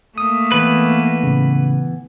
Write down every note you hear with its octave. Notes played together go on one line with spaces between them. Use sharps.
A3 A#3 D#6
E3 B3 B4
A2 C#3